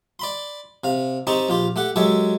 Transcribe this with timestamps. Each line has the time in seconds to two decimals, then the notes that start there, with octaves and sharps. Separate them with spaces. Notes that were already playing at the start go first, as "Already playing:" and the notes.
0.19 D5 B5 C6
0.84 C3 F5
1.27 C4 D#4 G4 A5 C#6
1.49 A#1 F4 G4
1.76 A3 G4 F#5
1.96 F#3 G#3 G4 A4 C#5 E5